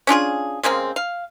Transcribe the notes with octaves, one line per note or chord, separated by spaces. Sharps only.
C#4 D4 F4 G#4
C#3 G#3 A#3 C4
F5